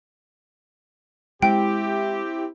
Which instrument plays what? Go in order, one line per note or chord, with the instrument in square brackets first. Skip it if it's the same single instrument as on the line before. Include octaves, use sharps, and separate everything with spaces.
[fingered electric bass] G#3 [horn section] C4 G4 [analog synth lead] E4 [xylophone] G5